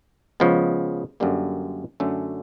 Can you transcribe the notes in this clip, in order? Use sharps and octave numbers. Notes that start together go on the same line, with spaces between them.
C#3 F3 G#3 B3
F#2 D3 G3 A#3
F#2 D3 F#3 A3 C#4